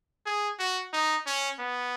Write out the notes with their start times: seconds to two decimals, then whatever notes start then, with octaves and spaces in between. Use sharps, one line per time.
0.26 G#4
0.59 F#4
0.93 D#4
1.27 C#4
1.59 B3